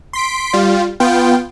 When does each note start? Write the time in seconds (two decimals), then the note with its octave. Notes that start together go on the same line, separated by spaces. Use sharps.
0.13 C6 B6 D7
0.53 G3 F4
1.00 B3 F4 G5